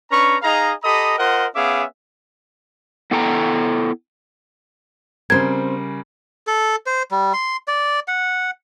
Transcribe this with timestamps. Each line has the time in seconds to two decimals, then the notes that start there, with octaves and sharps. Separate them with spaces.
0.10 C#4 D4 B4 A#5 C#6
0.42 D#4 G#4 D#5 F5 A#5
0.84 G4 A4 D#5 A#5 B5 D#6
1.18 F4 A#4 C5 D#5 F#5
1.55 B3 C#4 G#4 E5 F5 D6
3.11 B3 E4 A4 G5 A#5
5.30 C#3 G3 C4 A#4 C5 G#6
6.47 A4
6.86 C5
7.11 G3
7.34 C6
7.68 D5
8.08 F#5